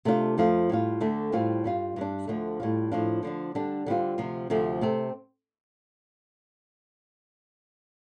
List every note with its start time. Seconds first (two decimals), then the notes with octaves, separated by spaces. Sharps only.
0.05 C3 A3 D4 F4
0.38 F2 F3 A3 F4
0.69 A2 G3 F4
1.01 D2 D3 A3
1.32 A2 G3 C4 F4
1.64 G2 G3 F4
1.96 G2 G3 D4
2.27 D2 D3 F3 A3
2.60 A2 G3 F4
2.92 A2 F3 D4 F4
3.23 D3 F3 D4
3.55 D3 G3 D4
3.86 D3 G3 C4 F4
4.18 D2 C3 F3
4.50 D2 C3 F3 A3
4.81 C3 A3 C4